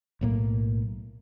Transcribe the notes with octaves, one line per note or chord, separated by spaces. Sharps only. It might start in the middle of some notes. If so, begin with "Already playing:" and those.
B1 A2 A#3